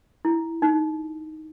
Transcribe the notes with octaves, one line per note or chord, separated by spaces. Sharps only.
E4
D#4